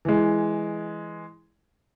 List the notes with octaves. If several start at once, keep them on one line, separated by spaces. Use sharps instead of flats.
E3 G#3